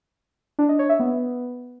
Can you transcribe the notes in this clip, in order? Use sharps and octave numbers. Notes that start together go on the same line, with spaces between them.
D4
D#5
C#5
E5
B3